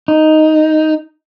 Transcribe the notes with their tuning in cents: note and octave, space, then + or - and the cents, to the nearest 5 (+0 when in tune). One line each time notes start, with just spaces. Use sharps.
D#4 +0